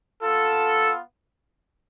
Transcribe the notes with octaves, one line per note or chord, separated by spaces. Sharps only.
B3 F4 A4